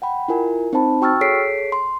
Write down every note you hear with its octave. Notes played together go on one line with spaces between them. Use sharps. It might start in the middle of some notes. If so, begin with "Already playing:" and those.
F#5 G5 B5
E4 F4 A#4 G#5
C4 D#4 C5 A5 B5
F#4 G5 C#6 E6 F6 A6
G#4 A4 C#5 B6 C7 D7
C6